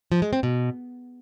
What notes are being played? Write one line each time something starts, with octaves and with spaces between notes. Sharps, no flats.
F3
G#3
C4
B2